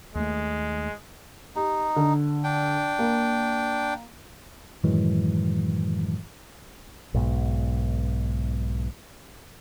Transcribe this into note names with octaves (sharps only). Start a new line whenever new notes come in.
D#2 G#3 A3
D#4 G4
D3
D4 G5
A#3
F#2 A2 D#3 E3 F#3 G#3
B1 G#2 B2